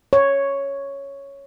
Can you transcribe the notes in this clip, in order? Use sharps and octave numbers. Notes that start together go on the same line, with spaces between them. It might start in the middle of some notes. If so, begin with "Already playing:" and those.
C#5